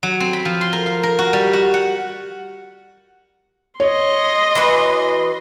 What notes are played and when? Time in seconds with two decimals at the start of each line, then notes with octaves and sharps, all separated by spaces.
0.03 F#3
0.20 C4
0.33 B5
0.45 F3
0.61 C6
0.73 A#4
0.86 F5
1.03 A#4
1.19 F#4
1.33 G3
1.53 F#4
1.74 F#5
3.80 C#5 D#5 C6
4.55 E3 F#4 B4